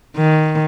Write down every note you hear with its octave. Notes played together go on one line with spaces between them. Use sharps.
D#3